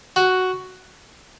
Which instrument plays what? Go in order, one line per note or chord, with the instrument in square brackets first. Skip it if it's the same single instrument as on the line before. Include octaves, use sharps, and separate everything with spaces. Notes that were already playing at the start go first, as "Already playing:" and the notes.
[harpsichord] F#4